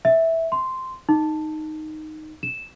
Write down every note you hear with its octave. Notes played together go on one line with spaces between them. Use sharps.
E5
C6
D#4
E7